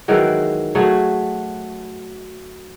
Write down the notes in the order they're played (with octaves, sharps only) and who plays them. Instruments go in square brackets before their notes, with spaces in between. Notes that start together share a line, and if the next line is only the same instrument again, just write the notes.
[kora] D#3 E3 F#3 G#3
F#3 A3 F#4 G#4